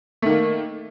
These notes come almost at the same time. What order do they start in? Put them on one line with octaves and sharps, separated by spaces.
A3 D#3 A#3